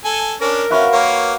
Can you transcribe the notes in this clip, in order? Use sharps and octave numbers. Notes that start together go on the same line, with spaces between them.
A4 G#5
C#4 D4 A#4
C#4 F#4 B4 F5
A#3 C#5